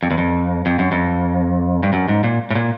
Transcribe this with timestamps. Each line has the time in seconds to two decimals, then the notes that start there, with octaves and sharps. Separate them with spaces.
0.03 F2
0.11 E2
0.18 F2
0.66 F2
0.79 F#2
0.92 F2
1.83 G2
1.93 F#2
2.09 G#2
2.24 A#2
2.50 A2
2.55 A#2